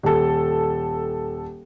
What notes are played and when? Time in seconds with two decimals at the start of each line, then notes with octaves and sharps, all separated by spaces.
0.03 D#1 A4